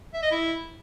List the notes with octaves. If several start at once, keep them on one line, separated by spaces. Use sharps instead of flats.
E5
D#5
E4